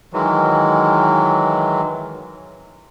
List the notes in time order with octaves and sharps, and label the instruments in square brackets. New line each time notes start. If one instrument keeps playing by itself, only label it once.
[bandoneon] D#3 E3 F#3 G#3